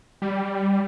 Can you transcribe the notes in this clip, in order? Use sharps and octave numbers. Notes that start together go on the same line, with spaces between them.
G3